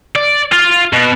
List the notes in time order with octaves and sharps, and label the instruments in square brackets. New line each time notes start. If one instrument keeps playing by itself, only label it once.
[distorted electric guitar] D5
F4
B2